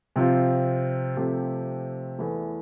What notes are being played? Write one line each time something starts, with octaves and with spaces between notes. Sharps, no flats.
C3 F3 C4 F4
C3 F3 A3 C4 G4
E2 E3 A3